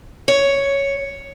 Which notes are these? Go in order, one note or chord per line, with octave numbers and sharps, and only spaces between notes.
C#5